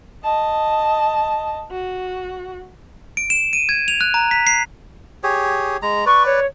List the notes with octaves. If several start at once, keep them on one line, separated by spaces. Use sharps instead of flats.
D#5 A5
F#4
D7
E7
D#7
G#6
F7
F#6
A#5
B6
C7
G4 G#4 C#5
G#3 A#5
B4 D5 C#6
C#5